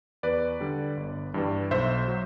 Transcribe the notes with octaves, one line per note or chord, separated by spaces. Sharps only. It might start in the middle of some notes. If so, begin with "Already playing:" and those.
E2 B4 D5
D3 G3
G1
G2 E3 G3
B1 C5 E5
F#3